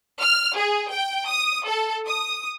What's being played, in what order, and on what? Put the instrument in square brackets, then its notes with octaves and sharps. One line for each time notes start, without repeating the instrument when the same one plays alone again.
[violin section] F6
G#4
G5
D#6
A4
D#6